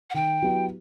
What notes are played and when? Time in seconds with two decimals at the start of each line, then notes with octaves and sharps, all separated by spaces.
0.10 F#5
0.14 D#3 G5
0.42 F#3 B3 E4 G4